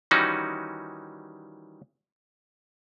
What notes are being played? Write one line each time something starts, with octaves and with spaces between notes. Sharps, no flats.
D#3 E3 G3 C#4 D#4 F#4